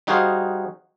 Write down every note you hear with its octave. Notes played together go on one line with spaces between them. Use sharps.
G3 D#4 F#4 G#4 C5 F5